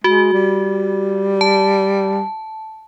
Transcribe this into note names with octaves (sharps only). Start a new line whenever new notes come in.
G#3 F#4
G3
A5